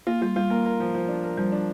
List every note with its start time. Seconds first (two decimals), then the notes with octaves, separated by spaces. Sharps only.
0.07 A#3 F4
0.22 G3 F4
0.36 G3 F4
0.50 A#3 A#4
0.66 A#4
0.80 F3
0.94 F3
1.08 D4
1.24 A#4
1.38 F3 G3
1.52 D4